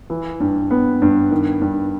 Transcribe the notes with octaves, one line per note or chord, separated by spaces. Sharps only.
E3
G2
B3
G2
D#3
G2